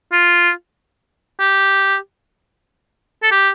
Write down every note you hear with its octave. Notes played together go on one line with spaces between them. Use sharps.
F4
G4
A4
G4